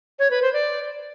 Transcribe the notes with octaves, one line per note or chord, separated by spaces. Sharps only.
C#5
B4
C5
D5